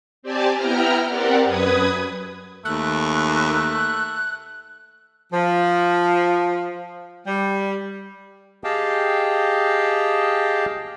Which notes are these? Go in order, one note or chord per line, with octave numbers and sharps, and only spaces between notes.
C4 G4 D5 G#5 A5
B3 E4 G5 A#5 F6
C4 G4 A#4 D5 F#5
F#2 B4 D#6 G#6
D#2 A3 F#6
F3
G3
G4 G#4 D#5 F5 G5 A5